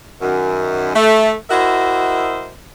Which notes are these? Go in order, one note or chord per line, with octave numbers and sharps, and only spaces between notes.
F#2 D#3
A3
E4 F#4 A#4 C5 D#5 E5